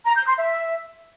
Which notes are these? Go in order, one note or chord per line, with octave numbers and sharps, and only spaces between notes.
A#5
G6
C6
E5